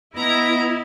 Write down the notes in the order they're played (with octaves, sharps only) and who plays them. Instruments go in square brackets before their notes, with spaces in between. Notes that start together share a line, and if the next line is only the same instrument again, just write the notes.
[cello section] B3 [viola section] E4 [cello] D#5 [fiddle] A#5